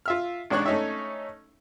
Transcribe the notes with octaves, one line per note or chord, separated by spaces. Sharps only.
F4 E5 F6
A1 G#2 D4 C#5 C#6 F#6
A3 C#4 D#4 C#5 E5